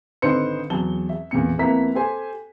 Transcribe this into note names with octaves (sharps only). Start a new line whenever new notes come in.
G#1 D3 D#4 B4 C5 C#7
E2 F#3 A5 G7
E5
A1 E2 A#2 C#7
F2 A#3 B3 E4 A#5 B6
G4 A4 C5 G#5